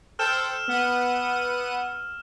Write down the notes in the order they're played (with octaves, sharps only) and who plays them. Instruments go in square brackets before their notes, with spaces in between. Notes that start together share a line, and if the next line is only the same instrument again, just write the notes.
[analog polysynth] A4 C5 G5 [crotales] E6 F6 E7
[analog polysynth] B3 F#5 D#7